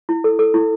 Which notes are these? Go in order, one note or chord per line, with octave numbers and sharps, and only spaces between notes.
E4
A4
A4
E4